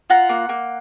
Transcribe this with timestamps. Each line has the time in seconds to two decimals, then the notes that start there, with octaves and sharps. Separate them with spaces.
0.10 F4 F#5 A#5
0.29 A#3
0.49 A#3